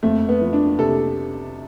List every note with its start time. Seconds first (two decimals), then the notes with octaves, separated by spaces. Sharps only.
0.03 F2 A3
0.28 B3
0.41 F3
0.53 D4
0.78 C3 A4